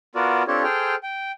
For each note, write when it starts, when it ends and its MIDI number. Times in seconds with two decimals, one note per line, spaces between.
0.15 0.43 59
0.15 0.43 65
0.15 0.43 66
0.15 0.43 70
0.15 0.43 74
0.48 0.63 60
0.48 0.63 62
0.48 0.63 65
0.48 0.63 67
0.48 0.63 69
0.48 0.63 73
0.64 0.95 68
0.64 0.95 69
0.64 0.95 72
0.64 0.95 79
0.64 0.95 89
1.03 1.32 79